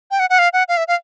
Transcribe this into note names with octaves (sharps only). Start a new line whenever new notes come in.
G5
F#5
F#5
F5
F#5
F5
E5
F5